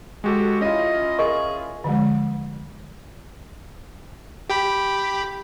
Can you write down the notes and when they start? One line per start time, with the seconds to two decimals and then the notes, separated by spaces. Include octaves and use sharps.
0.24 G#3 F#4 G4 A4
0.61 C#4 E4 F4 D#5
1.19 G#4 A#4 D#5 C#6
1.84 D3 F3 G#3
4.50 G4 G5 B5